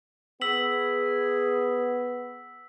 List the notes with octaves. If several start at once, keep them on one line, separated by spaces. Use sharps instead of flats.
B3 G#4 E6 B6 F#7